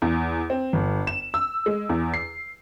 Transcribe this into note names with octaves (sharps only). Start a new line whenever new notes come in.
E2
C4
G1
E7
E6
G#3
E2
C7